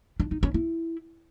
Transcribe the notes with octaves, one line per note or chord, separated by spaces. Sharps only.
D4
D#4
C#4
E4